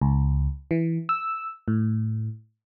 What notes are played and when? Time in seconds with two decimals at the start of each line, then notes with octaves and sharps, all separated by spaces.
0.02 C#2
0.71 E3
1.09 E6
1.68 A2